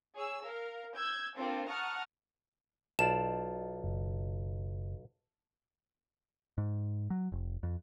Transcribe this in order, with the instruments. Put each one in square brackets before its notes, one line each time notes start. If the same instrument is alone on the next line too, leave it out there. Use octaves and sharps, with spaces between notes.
[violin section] G#4 C#5 E6
A#4 F5
E6 G6 G#6
A#3 C4 D4 F4 A4 C5
F#5 A5 A#5 C#6 D#6 F6
[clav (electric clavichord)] B1 F4 D5 [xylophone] A5 E7
[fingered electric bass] F#1
[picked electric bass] G#2
F#3
F1
F2